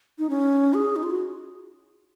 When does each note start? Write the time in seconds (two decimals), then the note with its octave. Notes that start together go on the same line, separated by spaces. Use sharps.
0.19 D#4
0.30 C#4
0.74 G#4
0.96 D#4
1.03 F4
1.10 F#4